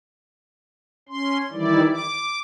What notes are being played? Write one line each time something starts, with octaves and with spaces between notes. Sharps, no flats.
C#4 C6
D#3 E3 G3 E4 D5
D6